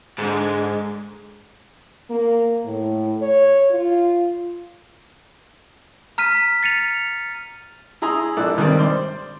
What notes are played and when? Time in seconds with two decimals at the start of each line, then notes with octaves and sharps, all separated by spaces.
0.18 G#2 D3 G#3
2.10 A#3
2.65 A2
3.22 C#5
3.71 F4
6.18 A#5 F6 B6 D#7
6.63 A6 C#7 D#7 F7
8.02 E4 G#4 A#5 C6 D#6
8.37 A#1 E4 A4 D5 F#6
8.57 G2 D#3 G3 C4
8.79 C5 D5 C6